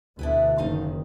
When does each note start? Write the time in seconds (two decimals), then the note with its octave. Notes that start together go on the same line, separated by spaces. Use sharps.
0.19 D2 B2 D4 E4 B4
0.58 F#1 D#3 F3 D#4 F5